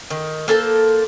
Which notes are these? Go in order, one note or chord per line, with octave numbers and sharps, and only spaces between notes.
D#3
A#3 A4 C5 A5